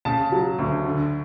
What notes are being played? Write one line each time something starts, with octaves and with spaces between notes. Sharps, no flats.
C#3 A5
F#3
D2
D3